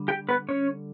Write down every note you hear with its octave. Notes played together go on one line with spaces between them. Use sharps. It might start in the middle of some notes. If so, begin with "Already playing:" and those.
Already playing: D3 G3
G4 G5
B3 B4
C#4 C#5